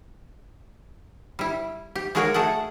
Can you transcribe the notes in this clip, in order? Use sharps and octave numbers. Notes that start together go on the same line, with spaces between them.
G3 E4
G4
G#3 A#3 F#4 G#4 A#4 C#5
A3 G#4 A4 F#5